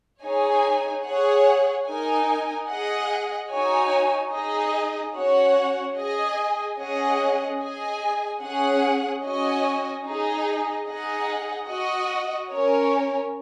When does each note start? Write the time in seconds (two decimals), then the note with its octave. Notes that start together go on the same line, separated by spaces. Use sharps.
0.22 D#4 G#4 C#5 G#5
1.05 G#4 C#5 F#5
1.86 D#4 A#4 D#5 G#5
2.68 G#4 D#5 F#5
3.50 D#4 F#4 C#5 G#5
4.32 D#4 G#4 D#5
5.14 C#4 F#4 C#5 F#5
5.96 G#4 D#5 G#5
6.78 C#4 G#4 D#5 F#5
7.59 G#4 D#5 G#5
8.41 C#4 G#4 F#5
9.23 C#4 F#4 D#5 G#5
10.05 D#4 G#4 D#5
10.87 D#4 G#4 D#5 F#5
11.68 F#4 D#5 F#5
12.50 C#4 A#4 C#5